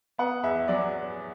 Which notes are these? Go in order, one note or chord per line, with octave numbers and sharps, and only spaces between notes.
B3 F#5
E2 E5
F#3 D5